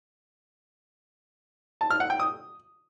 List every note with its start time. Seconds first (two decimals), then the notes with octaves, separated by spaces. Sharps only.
1.81 A5
1.91 F6
2.00 F#5
2.10 G5
2.20 D#6